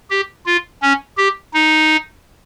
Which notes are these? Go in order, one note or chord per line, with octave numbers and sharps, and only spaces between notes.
G4
F4
C#4
G4
D#4